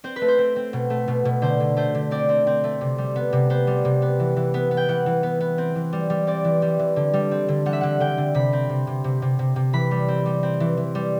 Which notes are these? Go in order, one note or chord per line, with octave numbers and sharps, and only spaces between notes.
C4 C5
B4
A3
C5
C4
C4
B2
A3
B2
B2
D3 C5
D3
A3 C5
D3
C4 D5
C4
C4
A3
C3
G3
B3
C3
B3 C5
G3
C3
B3
E3
E3
B3
B3
G5
E3 F#5
E3
B3
B3
C4
E3
G3
G3
C4 D5
E3
G3
E3
D3
G3
C4
D3
G3 F#5
E5
D3 F#5
D3 G5
D3
C3 B5
C4
C3
C3
C3
C3
C3
C3
E3 B5
G3
C4
G3
C4
E3
E3
G3